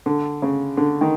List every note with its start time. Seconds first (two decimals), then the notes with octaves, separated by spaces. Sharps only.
0.06 D3
0.42 C#3
0.77 D3
1.01 D#3